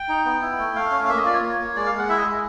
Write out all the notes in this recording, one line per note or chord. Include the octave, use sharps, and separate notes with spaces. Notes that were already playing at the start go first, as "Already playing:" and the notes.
Already playing: G5
D#4
B3
E4
A3
A3 F5
C#4
F5
A#3 E5
D#5
F4 D5
C#5
A#3
A#3
G#3 D5
F5
G#3
F#5
E4 E5
D#5
G#3